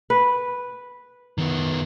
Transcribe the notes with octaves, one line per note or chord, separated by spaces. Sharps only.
B4
D#3 B3